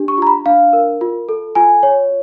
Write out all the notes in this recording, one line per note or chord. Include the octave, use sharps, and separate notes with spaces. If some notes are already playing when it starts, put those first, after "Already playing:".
Already playing: D4 G4
C#6
F4 A#5
B5
D4 F5
A#4
F4
A4
F4 G#5
C#5